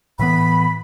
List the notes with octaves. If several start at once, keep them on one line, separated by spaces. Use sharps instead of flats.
A2 E3 B3 B5